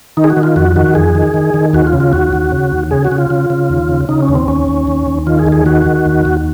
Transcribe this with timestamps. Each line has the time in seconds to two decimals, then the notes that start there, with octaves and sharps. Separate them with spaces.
0.17 D#3 D#4
0.24 G#4
0.30 F#4
0.37 D#3
0.43 F4
0.56 F2 F#4
0.76 D#3 F#4
0.95 F2 G#4
1.15 D#3
1.34 D#3
1.54 D#3
1.73 D#2 F#4
1.87 F4
1.93 C#3
2.00 F4
2.13 D#2 F#4
2.33 D#2
2.52 C#3
2.72 D#2
2.91 C#3 G#4
3.05 F#4
3.12 C#3
3.18 F4
3.30 C#3
3.50 C#3
3.70 D#2
3.89 C#3
4.09 C#3 D#4
4.22 C#4
4.28 D#2
4.35 C4
4.48 D#2 C#4
4.68 D#2
4.87 D#2
5.07 D#2
5.26 D#3 F4
5.39 G#4
5.47 D#2
5.52 G#4
5.66 D#3 F#4
5.86 D#3
6.05 D#2
6.25 D#2